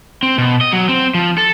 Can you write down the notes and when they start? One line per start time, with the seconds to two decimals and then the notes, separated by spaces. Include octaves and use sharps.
0.23 C4
0.38 B2
0.61 D#5
0.73 F#3
0.89 C4
1.14 F3
1.38 A4